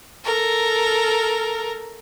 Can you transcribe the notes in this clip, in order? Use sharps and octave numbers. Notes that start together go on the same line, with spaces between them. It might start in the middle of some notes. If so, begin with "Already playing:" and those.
A4 A#4